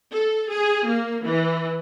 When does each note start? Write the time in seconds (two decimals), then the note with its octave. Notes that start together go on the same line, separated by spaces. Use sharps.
0.12 A4
0.49 G#4
0.87 A#3
1.24 E3